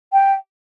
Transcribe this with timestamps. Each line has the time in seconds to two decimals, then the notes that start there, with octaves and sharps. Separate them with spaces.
0.12 G5